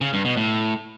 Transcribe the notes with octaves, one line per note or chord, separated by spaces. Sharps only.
C#3
G2
B2
A2